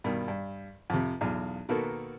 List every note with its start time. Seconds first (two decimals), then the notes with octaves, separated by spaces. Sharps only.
0.04 G2 B2 D#3
0.28 G2
0.90 F2 C3
1.21 B1 E2 F4 F5
1.69 B2 D#3 A#3 B3 F#4 A4